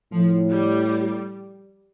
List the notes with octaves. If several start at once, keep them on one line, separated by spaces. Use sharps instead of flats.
A2 F3
G3